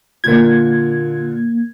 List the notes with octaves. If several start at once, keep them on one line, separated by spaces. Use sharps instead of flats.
A#2 D3 A#3 F4 G#6